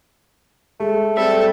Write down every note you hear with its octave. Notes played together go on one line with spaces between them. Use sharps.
G#3 A3
G3 C4 A4 E5